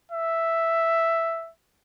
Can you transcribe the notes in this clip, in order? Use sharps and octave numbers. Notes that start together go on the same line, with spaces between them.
E5